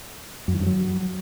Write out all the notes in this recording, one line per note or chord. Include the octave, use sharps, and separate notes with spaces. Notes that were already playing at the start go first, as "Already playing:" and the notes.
F#2
E3
G2
F#3